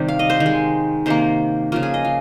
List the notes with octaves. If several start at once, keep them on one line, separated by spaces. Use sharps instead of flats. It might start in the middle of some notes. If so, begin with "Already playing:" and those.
Already playing: C3 D#3 G3
F5
D#5
C5
D#3
G#3
C3 D#3 A#3 C5
C#3 F3 A#3 F4
G#4
D#5
F4